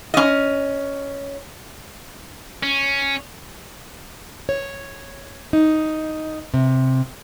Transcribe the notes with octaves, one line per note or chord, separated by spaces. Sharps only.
C#4 D#5
C#4
C#5
D#4
C3